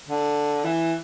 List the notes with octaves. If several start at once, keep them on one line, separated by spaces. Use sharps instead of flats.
D3
E3